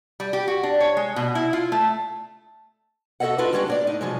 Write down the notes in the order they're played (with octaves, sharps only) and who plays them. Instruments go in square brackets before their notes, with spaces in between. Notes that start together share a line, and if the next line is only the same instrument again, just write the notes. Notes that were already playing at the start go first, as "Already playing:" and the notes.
[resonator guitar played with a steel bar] G3
G4
F#4
D4
C#5
G#3
B2
E4
F4
A3
[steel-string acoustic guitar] F#4 A4 C#5 D#5 E5 F#5
D4 F4 F#4 A4 B4
G3 G#3 C#4 D4 F#4 G4
A#2 D4 D5
A2 D#4
B2 F3 F#3 G#3